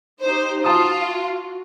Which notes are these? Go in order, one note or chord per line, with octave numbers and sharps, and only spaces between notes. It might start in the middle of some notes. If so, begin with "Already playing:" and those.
D#4 G4 C5
F4 F#4 A5 D#6